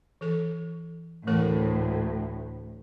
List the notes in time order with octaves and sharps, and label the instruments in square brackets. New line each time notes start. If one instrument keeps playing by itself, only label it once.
[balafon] E3 A4
[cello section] D2 A2 [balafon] E3 A3 A#4